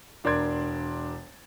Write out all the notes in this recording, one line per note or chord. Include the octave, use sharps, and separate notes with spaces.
E1 D4 A#4 D5 C6 G#6